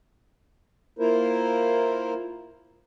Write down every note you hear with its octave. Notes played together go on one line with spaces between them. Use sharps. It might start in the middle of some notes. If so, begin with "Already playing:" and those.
A#3 E4 F4 A#4 C5